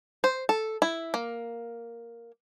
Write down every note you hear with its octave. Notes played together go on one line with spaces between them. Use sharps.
C5
A4
E4
A#3